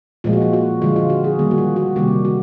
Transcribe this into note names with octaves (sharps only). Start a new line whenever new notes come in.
A#2 F3 G#3 F4
F#4
F4
F#4
D3 F3 G#3 F4
F4
F#4
G#4
D#3 G3 A#3
F#4
F4
F#4
C3 D#3 G3 A#3 G4
F#4